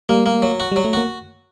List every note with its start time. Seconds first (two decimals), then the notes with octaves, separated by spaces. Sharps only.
0.09 G3 A#3
0.26 A#3
0.42 F#3
0.60 F#4
0.72 G3
0.76 F#3
0.85 A3
0.93 A#3 F#4